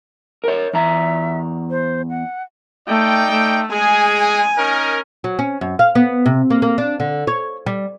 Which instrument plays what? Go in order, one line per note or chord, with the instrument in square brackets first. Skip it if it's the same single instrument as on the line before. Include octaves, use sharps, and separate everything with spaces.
[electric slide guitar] A#4 C#5
[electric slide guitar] E2 A#5 [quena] E5
[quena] C5
F#5
[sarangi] A3 [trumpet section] D#4 D5 G5
[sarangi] A3
[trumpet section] G#3 G#4 [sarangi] G#5
[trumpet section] C#4 D#4 A#4
[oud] F#3
C#4
F#2
F5
B3
C3
A#3
A#3
D4
D3
C#5
G3